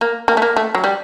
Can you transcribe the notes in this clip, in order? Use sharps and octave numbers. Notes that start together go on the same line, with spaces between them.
A#3
A#3
A3
A#3
A3
F#3
G3